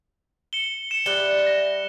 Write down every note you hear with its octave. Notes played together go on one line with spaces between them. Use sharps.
C#7 E7 G7
C#7 E7
G3 E5 F#6 G7
A#6